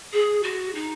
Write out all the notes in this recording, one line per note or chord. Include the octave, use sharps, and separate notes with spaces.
G#4
F#4
D#4